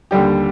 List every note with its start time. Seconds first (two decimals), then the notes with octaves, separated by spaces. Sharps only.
0.11 D#2 D3 G3 G4